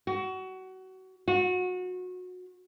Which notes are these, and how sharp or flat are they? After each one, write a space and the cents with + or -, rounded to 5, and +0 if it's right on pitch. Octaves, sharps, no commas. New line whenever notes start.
F#4 +25
F#4 -25